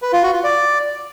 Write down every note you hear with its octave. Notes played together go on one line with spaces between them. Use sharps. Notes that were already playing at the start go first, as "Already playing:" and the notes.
B4
F4
F#4
F4
D5